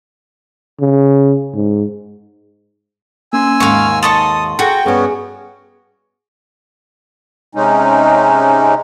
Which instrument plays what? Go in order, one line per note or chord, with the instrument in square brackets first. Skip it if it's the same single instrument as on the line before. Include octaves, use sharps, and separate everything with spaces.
[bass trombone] C#3
G#2
[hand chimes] A#3 C#4 C6 [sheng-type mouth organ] G#5 E6
[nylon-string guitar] D#2 G#2 A#3 [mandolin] F5 C#6 [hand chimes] C6
[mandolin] A4 D#5 C#6 [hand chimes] C6 [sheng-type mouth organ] D#6
[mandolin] F#4 [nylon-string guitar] G#4 A4 [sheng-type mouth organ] G5
[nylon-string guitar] G2 G3 [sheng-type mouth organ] B3 C#4 [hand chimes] G#4 G#5 C#6
[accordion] C3 G#3 C#4 D#4